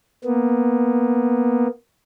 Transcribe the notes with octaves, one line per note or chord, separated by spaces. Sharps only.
A#3 B3